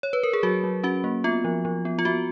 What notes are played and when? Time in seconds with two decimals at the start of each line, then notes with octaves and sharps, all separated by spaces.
0.03 C#5
0.13 B4
0.23 A#4
0.33 G#4
0.43 F#3 F#4
0.64 F#3
0.84 C#4 F#4
1.04 A#3
1.24 B3 F4
1.45 F3
1.65 F3
1.85 B3
1.99 F4
2.05 B3 F#4